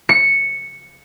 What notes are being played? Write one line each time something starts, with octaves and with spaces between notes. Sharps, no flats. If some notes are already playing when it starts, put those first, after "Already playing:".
C#7